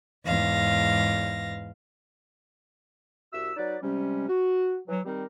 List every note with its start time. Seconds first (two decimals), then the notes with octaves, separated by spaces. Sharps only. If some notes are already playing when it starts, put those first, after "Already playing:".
0.25 E2 G#2 F5 A#6
3.33 C2 F#4 E5 E6
3.57 F#3 D#4 B4 D5
3.82 C3 G3 G#3 C#4
4.28 F#4
4.88 E3 F#3
5.05 D#3 G3 C4 D#4 G4 A#4